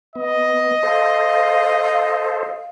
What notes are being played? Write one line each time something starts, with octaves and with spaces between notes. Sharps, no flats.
B3 D#5
A4 C5 F5